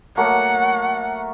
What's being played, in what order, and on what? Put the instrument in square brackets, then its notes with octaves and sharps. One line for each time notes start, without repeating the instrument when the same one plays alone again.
[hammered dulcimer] F#3 A3 A#3 [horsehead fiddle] F#5